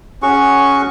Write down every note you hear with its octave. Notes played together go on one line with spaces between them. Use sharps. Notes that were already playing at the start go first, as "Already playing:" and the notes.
C#4 F#4 G#4 C#6